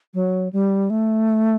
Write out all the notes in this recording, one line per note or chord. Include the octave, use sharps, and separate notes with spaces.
F#3
G3
A3